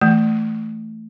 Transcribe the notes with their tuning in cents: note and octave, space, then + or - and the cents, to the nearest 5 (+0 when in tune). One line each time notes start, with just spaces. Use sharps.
E3 +0 A3 +0